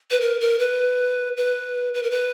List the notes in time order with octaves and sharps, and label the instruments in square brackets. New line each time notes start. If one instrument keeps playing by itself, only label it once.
[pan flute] B4
A#4
A#4
B4
B4
B4
A#4
B4